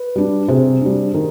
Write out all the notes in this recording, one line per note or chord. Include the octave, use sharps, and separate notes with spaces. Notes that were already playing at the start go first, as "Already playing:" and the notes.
Already playing: B4
G3 D4
C3 G#4 C5
G3 D4
D#3